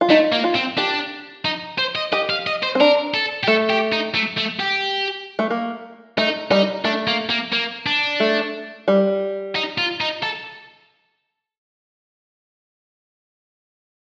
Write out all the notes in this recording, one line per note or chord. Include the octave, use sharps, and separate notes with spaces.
F4
A3 D#4
A#3
F4
C4
D4 G4
D#4
C5
D#5
G4 D#5
F5
D#5
C5
C4
D4 A#4
A4
G4
A3 A4
G4
D#4
A3
A3
G4
A3
A#3
A3 D#4
G3 D#4
A3 D4
A#3
A#3
A#3
D4
A3
G3
D#4
F4
D#4
A4